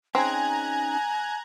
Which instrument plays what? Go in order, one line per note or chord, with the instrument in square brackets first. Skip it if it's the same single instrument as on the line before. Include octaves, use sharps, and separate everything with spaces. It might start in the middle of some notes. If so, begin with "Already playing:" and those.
[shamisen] C4 [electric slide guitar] C#4 D#4 G#4 [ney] G#5 [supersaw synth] A#5 F#6 G#6